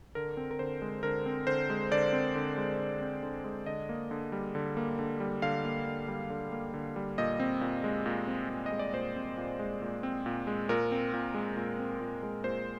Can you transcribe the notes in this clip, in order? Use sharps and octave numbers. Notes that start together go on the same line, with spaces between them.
D3 A#4
C4
A#4
D3 C5
G#3
D3 A#4
C4
D3 C5
G#3
D3 D5
C4
D3
G#3
D3
C4
D3
G#3
D3 D#5
A#3
D3
G3
D3
A#3
D3
G3
D3 F5
A#3
D3
G3
D3
A#3
D3
G3
A#2 D#5
C4
A#2
G#3
A#2
C4
A#2
D#5
G#3
D5
A#2 C5
C4
A#2
G#3
A#2
C4
A#2
G#3
A#2 A#4
C4
A#2
G#3
A#2
C4
A#2
G#3
A#2 C5